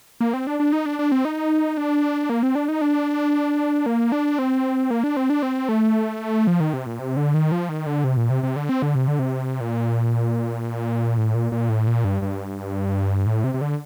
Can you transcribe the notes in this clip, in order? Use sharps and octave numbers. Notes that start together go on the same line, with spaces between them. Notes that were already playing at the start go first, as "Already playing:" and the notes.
A#3
C4
D4
D4
D#4
D4
D4
C4
D#4
D4
A#3
C4
D4
D#4
D4
A#3
D4
C4
A#3
D4
C4
D4
C4
A3
F3
D#3
C3
A#2
C3
D3
D#3
F3
D#3
D3
C3
A#2
C3
C3
D3
C4
D3
C3
D3
C3
A#2
A2
A#2
A#2
A2
A#2
G2
G2
A2
C3
C3
D3